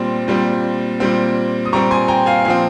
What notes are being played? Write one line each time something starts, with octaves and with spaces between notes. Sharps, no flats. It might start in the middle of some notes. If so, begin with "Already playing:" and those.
Already playing: A#2 G3 C4 C6
A#2 G3 C4
A#2 G3 C4
D#6
A#2 G3 C4 A#5 C#6
G#5 C6
G5 A#5
F5 G#5
A#2 F3 C4 F5